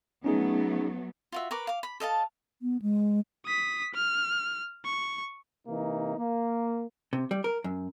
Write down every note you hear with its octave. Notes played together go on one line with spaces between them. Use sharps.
F#3 A3 B3 C#4 D#4 G#4
F4 F#4 E5
A#4 B4 C#6 D6
F5 D6
B5
A4 D#5 F5 A5
B3
G#3
D#6 B6
F6
C#6
C3 E3 A#3 D#4
A#3
C3
G3
A#4
F#2